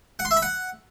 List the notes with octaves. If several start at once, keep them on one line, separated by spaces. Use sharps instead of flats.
F#5
C6
E5
B5
F#5